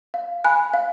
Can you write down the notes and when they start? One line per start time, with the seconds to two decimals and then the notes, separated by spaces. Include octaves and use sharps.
0.14 F5
0.44 G#5 B5 F#6
0.74 F5